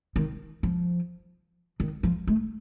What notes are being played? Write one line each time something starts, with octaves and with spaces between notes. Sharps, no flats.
D#3
F3
D#3
F3
A3